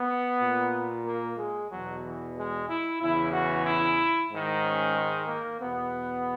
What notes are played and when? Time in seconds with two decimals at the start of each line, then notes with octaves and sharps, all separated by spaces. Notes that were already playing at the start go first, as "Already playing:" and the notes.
Already playing: B3
0.40 A#2
1.04 A#3
1.37 G#3
1.69 E2 B2 F#3
2.03 E3
2.35 G#3
2.67 E4
2.99 E2 C#3 E3 E4
3.33 F#4
3.64 E4
4.30 G#2 D#3
4.62 C#4
4.94 G#3
5.27 A#3
5.59 E2 B2 B3